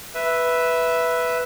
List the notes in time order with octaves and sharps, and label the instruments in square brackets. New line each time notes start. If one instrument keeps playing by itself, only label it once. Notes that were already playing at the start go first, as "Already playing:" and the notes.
[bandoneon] B4 E5